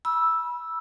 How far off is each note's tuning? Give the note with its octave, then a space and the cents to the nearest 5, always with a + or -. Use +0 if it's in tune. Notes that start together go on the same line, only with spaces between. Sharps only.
B5 -25 E6 +0